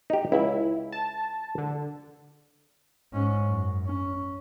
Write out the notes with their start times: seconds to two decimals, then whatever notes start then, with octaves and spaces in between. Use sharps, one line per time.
0.10 D#4 G4
0.32 C#2 E4
0.92 A5
1.58 D3
3.13 G#2 C#4
3.47 F#2
3.86 C#4